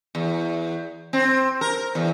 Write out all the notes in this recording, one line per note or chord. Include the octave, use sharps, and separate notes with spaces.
E2
C4
A#4
E2